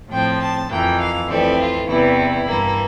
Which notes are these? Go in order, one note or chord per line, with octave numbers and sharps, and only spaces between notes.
A2 F3 C4 G5
A5
F2 E3 A#3 G5
F5
F2 E3 A3 C4 D5
F4
E2 C3 E3 G3 E4
G2 E3 A#3